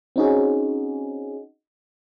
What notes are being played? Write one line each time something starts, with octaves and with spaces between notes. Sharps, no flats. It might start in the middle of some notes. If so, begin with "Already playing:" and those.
C4 C#4 D#4 F#4 G#4